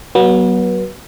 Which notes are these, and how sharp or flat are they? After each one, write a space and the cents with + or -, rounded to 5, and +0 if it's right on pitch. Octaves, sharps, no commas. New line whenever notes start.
F#3 +20 B3 -30